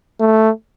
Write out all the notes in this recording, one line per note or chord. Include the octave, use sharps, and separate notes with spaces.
A3